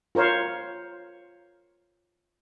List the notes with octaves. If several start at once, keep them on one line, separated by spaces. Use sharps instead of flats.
F4 A#4 C5 C#5 F5